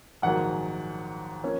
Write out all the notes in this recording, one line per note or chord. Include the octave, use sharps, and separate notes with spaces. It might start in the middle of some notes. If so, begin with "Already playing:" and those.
A#1 G#2 D#3 F#3 F#5
F3 A#3 C#4